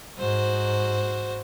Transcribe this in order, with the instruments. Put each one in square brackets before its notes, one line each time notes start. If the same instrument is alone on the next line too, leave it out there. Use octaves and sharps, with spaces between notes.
[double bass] G#2 [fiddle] F#4 C5